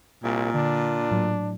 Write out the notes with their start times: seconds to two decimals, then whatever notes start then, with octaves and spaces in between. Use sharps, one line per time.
0.24 C2 A#2
0.54 D3 D4
1.11 A2 F#3